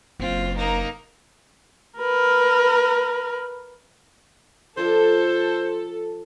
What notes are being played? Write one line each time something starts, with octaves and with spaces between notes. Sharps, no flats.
F#1 C4 F4
A#3 D#4
A#4 B4
F3 D4 F4 A4 C5